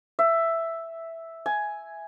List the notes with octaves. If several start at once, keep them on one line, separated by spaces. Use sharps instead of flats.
E5
G#5